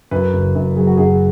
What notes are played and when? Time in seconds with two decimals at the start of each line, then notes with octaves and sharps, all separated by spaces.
0.11 F#2 B4
0.33 F#1
0.55 F#2
0.76 F#3 G#4
0.87 F#4
0.97 F#2 G#4